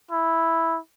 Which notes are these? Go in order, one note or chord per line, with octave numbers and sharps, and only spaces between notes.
E4